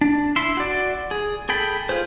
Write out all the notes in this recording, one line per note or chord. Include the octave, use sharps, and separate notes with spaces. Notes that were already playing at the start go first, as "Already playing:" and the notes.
D4
E4 E5 C6
F#4 D5
G#4
G#4 A4 G5 B5
F4 G#4 C5